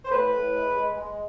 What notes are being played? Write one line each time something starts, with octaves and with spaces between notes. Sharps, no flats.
C5
A2 B4
A2
G#3
G#3
G#3